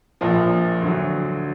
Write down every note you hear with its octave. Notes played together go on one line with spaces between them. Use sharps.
A#1 A#2 F3
D2 D3 F#3